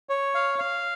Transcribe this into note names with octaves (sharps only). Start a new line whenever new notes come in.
C#5
F5
F5